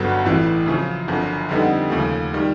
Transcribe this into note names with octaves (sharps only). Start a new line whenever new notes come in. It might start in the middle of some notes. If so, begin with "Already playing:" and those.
Already playing: G1 G2 D3 F#3 B3
A1 A2 E3
F#2 C#3 F3
G1 F#2 D3 F3
F2 D3 G3 B3 D#4
D#2 C#3 F3 A3
D#3 G3